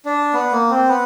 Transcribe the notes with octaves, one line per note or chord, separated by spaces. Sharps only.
D4
B3
A#3
C4
B3